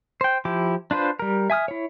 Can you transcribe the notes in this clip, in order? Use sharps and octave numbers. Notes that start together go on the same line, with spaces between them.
C5 G5
F3 E4 G4 D6
D4 F4 B4 C5
G3 A#4
E5 G#5 D#6 F6
E4 C#5